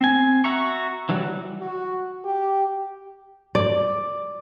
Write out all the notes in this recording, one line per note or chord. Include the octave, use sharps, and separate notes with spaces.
C4 G#5
F#4 E5 A#5 C#6
E3 F#3 G3 F#4
F#4
G4
D5